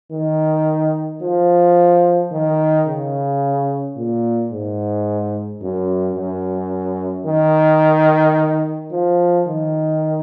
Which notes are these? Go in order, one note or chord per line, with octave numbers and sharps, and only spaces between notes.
D#3
F3
D#3
C#3
A#2
G#2
F#2
F#2
D#3
F3
D#3